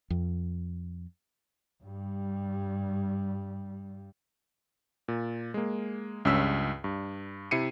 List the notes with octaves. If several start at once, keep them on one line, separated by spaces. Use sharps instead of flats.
F2
G2 G3
A#2
G#3 A#3
C#2 G2 C#4 E6 B6
G2
C3 E4 C7 C#7 D#7